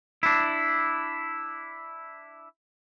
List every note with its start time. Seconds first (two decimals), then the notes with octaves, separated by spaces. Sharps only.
0.23 D4 E4